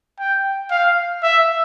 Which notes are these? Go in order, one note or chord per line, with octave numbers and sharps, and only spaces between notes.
G5
F5
E5